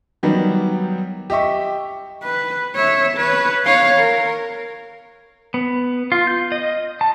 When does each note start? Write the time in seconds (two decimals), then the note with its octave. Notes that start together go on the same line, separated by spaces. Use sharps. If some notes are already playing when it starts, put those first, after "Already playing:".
0.23 D#3 F#3 G3 B3
1.30 G4 D#5 E5 C#6
2.24 B4
2.76 C#5 E5
3.18 B4 C#5
3.66 C#5 F5
4.00 A#4
5.54 B3
6.12 F4
6.27 G6
6.52 D#5
7.01 A5